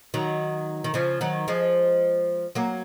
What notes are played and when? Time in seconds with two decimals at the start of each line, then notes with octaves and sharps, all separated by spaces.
0.14 D#3 F#3
0.84 D#3
0.94 C#3 F3
1.21 D#3 F#3
1.48 F3 G#3
2.55 F#3 A#3